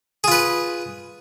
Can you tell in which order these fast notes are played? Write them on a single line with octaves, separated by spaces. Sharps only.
G#4 F4 B4